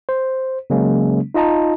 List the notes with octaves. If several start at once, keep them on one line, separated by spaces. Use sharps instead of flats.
C5
C#3 F#3 G#3 A#3 C#4
D#4 F4 D#5 A5 A#5